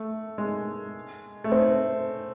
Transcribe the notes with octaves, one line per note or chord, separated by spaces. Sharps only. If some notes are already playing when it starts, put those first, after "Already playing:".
Already playing: A3
G#3
A3
C4